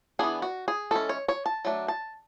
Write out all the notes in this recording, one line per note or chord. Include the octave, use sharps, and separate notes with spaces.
E3 B3 D4 G#4
F#4
G#4
E3 G#3 C#4 A4
C#5
C#5
A5
F#3 A3 D4
A5